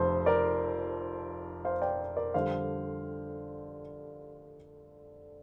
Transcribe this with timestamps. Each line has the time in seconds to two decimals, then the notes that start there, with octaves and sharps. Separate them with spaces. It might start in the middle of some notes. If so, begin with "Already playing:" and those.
Already playing: F1 F2 F3 C5
0.26 A#4 D5
1.65 C5 F5
1.82 D5 G5
2.17 A#4 D5
2.34 F2 D3 G3 C5 F5